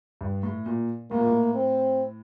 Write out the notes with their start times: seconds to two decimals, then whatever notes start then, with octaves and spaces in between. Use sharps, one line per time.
0.21 G2
0.43 A2
0.66 A#2
1.11 A2 A#3
1.18 A#2
1.27 A2
1.55 C4